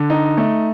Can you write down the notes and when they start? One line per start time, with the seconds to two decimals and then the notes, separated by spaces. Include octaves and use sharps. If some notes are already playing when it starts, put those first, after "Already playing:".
Already playing: D3
0.10 D#4
0.37 A3